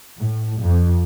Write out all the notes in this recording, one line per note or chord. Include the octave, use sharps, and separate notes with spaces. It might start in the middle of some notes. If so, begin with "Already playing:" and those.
A2
F2